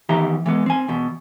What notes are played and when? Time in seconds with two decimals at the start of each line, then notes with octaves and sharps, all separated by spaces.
0.09 E2 D#3 E3 G4 E5 A#5
0.46 E3 G#3 B3
0.66 C4 G#5
0.88 E2 B2